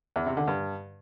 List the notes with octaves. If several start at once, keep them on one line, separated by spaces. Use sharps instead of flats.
E2
C3
D3
G2